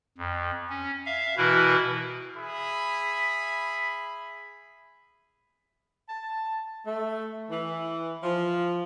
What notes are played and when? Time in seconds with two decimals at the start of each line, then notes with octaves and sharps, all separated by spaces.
0.18 F2
0.70 C#4
1.06 E5 F5
1.37 B2 E3 E4 F#4 A#4 B4
2.36 G#4 E5 B5
6.09 A5
6.85 A3
7.49 E3
8.23 F3